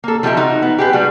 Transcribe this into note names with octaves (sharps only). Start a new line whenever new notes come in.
A#3 A4
F3 A#3 D#4 F#4 G4 E5
D#4 F#4
B3
G4 G#4 B4
G3 A3 F#4 G#4